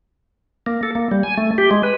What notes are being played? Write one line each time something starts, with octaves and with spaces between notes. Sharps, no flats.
A#3
A4
A#3
G3
G#5
A3
G4
G#3
B4